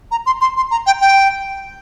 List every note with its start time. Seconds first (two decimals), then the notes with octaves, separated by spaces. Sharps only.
0.11 A#5
0.26 C6
0.41 C6
0.57 C6
0.71 A#5
0.87 G5
1.01 G5